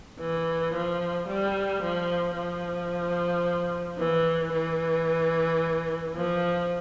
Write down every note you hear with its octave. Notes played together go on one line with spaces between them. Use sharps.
E3
F3
G3
F3
F3
E3
E3
F3